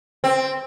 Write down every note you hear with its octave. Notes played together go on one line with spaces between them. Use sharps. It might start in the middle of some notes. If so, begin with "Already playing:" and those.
C4